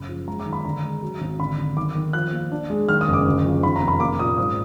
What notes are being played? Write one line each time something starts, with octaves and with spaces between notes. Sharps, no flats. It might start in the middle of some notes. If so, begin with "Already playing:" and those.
Already playing: F#1 B5
F3
G#3 A#5
D6
D#3
B5
D3 A#5
G#3
F#3
G#1
D3 B5
D3
D#3 D6
D#3
F3 F#6
A#3
D4
G#3
D#3 F6
D#6
F#1
D6
D2
F3
D#3 B5
A#5
F1
B5
A#3 D6
A#2 D#6
G#2 D#6